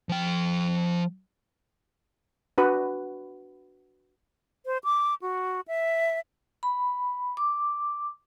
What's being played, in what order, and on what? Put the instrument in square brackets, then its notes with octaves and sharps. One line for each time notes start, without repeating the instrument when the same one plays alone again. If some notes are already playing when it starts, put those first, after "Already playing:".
[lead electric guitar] F3 G5
[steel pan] D4 F#4 B4
[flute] C5
D6
F#4
E5
[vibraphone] B5
D6